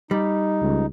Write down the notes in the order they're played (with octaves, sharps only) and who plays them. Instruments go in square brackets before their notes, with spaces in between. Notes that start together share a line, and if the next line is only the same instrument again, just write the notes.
[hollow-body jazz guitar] G3 [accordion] D#4
[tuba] C#2